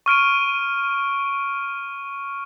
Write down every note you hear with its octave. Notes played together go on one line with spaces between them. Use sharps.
C#6 F6 D7 D#7